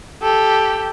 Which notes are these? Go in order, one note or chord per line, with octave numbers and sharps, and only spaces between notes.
G4 A4